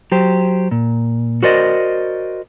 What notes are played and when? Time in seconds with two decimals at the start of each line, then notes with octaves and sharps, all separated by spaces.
0.12 F#3 G4 C5
0.71 A#2
1.43 F#4 A#4 C5 D5 D#5